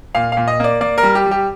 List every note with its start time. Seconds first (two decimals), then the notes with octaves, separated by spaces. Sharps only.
0.15 A#2 F5
0.32 A#2 F5
0.48 D#5
0.60 A#3 D5
0.81 A#3 D5
0.98 A#4
1.03 G3
1.15 G4
1.26 G3
1.31 G4